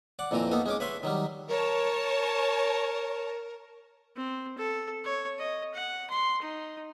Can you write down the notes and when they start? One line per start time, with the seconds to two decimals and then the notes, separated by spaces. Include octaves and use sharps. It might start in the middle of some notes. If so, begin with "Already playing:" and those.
0.19 D5 F#5
0.31 F2 A#2 E3 C4 A#5
0.51 A#3 B3 D#4 A4
0.66 G#3 C#4 D6
0.80 B4 C#5 E5 C6
1.03 D#3 F#3 G3
1.49 A#4 C#5 A5
4.17 C4
4.58 A4
5.04 C#5
5.39 D#5
5.74 F#5
6.10 C6
6.42 D#4